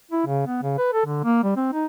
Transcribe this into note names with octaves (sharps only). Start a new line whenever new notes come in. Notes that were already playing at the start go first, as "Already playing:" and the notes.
E4
C#3
B3
C#3
B4
A4
D3
A#3
G3
C4
D#4